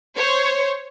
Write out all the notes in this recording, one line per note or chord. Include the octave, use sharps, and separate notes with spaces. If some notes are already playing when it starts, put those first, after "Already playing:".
C5 C#5